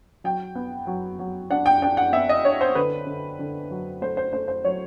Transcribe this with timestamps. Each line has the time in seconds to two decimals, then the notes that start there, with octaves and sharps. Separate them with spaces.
0.24 F#3 G5
0.55 B3
0.87 F#3
1.19 F#3
1.50 D4 F#5
1.66 G5
1.82 D4 G5
1.97 F#5
2.12 B3 E5
2.29 D#5
2.44 D4 C#5
2.61 C5
2.75 D3 B4
3.07 D3
3.39 D3
3.71 F#3
4.02 A3 C5
4.17 C5
4.33 A3 C5
4.48 C5
4.64 F#3 C#5